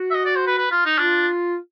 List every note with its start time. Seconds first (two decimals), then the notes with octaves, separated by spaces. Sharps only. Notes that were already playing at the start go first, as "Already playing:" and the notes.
Already playing: F#4
0.11 E5
0.15 D#5
0.25 D5
0.36 C5
0.47 B4
0.57 B4
0.71 F4
0.85 D#4
0.98 D4 F4